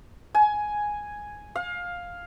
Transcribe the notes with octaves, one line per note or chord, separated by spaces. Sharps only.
G#5
F5